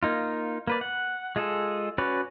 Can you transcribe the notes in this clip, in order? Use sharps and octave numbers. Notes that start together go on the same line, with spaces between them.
A#3 D#4 F4
A#3 B4 D5
F#5
G#3 F4 G#4 A4
C#4 F#4 B4 C#5 D5